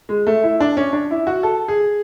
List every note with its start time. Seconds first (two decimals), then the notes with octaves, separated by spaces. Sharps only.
0.09 G#3
0.27 A3
0.44 E4
0.60 D4
0.77 C#4
0.93 D4
1.11 E4
1.27 F#4
1.43 A4
1.68 G#4